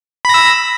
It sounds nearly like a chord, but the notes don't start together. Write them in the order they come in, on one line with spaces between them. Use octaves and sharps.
B5 A#6 E6